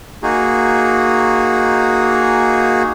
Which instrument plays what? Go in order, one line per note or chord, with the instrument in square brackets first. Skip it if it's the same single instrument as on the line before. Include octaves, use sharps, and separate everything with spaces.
[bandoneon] A#3 D#4 F#4 G#4